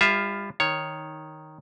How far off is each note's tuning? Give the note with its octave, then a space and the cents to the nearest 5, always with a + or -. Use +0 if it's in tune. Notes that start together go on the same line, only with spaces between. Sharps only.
G3 +35 F4 +0 E5 +0
D#3 +0 C#5 +0